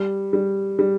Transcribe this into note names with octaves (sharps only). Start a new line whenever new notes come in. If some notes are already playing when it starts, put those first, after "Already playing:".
Already playing: G3
G3
G3